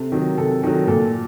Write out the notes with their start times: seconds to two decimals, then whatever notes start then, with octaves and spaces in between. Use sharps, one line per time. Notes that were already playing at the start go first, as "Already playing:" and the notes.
Already playing: C3 A4
0.12 D#3 F#3
0.38 C3 A4
0.63 D#3 F#3 A4
0.87 A#2 A4